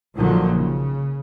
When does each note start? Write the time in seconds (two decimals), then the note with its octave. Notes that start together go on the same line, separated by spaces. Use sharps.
0.16 A#1 A#2 D3 D#3 F3 F#3
0.56 C#3